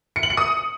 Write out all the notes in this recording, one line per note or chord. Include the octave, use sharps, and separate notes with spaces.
C#7
F#7
C#7
D#6